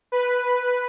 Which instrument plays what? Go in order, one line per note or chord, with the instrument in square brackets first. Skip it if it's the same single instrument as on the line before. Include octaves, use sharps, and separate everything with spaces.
[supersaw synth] B4